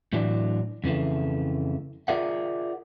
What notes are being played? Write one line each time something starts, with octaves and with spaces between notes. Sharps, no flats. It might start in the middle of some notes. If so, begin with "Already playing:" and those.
A2 E3 F#3 D4
F2 C#3 E3 A3
F4 G#4 A#4 D5 E5 F#5